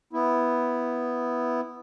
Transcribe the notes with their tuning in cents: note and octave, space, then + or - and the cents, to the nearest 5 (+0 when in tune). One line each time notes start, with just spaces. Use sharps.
B3 +0 E4 +0